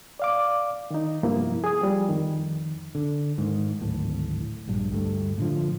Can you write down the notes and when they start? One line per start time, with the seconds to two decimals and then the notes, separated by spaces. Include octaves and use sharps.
0.19 D5 F5 D6
0.91 D#3 D#4
1.23 G2 C3 F3 A#3 B3 E4
1.64 G#4 D#6
1.81 F3 G3
2.09 F2 D#3
2.95 D3
3.38 G#2 D#3
3.81 D1 G#1 A2
4.67 A#1 G2
4.90 D2 G2 G3 A3
5.38 A2 D3 F3